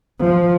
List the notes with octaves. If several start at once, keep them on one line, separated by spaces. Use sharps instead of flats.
F3